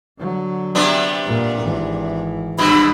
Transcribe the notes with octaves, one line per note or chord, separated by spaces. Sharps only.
D3 F#3
C3 B3 D4
A#2
G#1 E3
G#1 G2 B2 B5